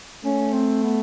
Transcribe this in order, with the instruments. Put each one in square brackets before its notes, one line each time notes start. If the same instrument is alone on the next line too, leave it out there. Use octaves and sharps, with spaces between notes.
[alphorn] A3 [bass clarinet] C#4
[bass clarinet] C4
B3